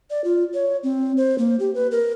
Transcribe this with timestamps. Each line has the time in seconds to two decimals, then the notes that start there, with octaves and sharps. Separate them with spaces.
0.10 D5
0.24 F4
0.54 C#5
0.83 C4
1.17 C5
1.38 A#3
1.60 G4
1.75 B4
1.91 A#4